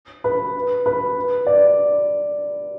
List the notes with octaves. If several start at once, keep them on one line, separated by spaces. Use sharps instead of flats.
B4
B4
D5